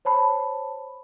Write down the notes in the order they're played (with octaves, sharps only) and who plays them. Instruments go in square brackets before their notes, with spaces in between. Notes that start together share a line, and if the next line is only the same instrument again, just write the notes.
[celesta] C5 C#5 A5 B5